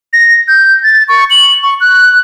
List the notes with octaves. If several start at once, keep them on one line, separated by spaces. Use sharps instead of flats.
A#6
G6
A6
C#6
F#7
C#6
F#6